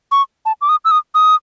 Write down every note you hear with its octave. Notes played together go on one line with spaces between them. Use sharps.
C#6
A5
D6
D#6
E6
D#6
D#6